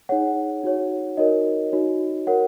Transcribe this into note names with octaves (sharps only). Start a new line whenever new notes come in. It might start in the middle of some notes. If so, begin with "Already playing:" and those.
D#4 G#4 C#5 F#5
D#4 F#4 C#5
D#4 F#4 A#4 C#5 D#5
D#4 F#4 C#5
F#4 A#4 C#5 F#5